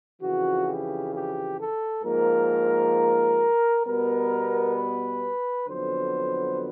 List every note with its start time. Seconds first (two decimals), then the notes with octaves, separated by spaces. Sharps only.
0.21 F2 C#3 E3 F#4
0.67 G4
1.13 G4
1.59 A4
2.04 G#2 F3 A#3 A#4
3.86 B2 G3 B3 A#4
4.77 B4
5.68 F2 D3 F#3 B3 C5